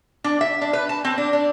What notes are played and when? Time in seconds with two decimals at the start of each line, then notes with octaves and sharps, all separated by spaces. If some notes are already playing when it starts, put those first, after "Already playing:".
0.24 D4
0.41 E5
0.62 D4
0.73 B4
0.89 A5
1.05 C4
1.18 D4
1.33 D4